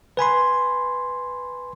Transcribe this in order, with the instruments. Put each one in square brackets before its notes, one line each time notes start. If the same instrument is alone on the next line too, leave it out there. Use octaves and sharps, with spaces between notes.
[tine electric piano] B4 G#5 B5 C6